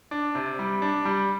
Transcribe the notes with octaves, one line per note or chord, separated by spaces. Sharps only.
D4
C3
G3
D4
G3